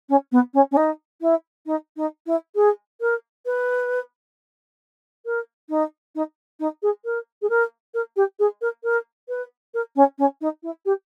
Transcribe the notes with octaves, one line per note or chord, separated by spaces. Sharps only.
C#4
B3
C#4
C#4
D#4
E4
D#4
D#4
E4
G#4
A#4
B4
A#4
D#4
D#4
D#4
G#4
A#4
G#4
A#4
A#4
G4
G#4
A#4
A#4
B4
A#4
C#4
C#4
D#4
E4
G4